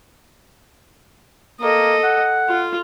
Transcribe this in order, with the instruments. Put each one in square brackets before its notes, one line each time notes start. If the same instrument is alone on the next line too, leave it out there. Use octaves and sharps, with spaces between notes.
[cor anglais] A#3 [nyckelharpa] A4 D#5
[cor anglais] F#5
[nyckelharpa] F4